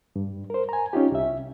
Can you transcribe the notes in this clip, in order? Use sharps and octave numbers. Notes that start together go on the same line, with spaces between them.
G2
A#4 C5
G#5 A#5
C#4 D#4 F4 G4
C2 E5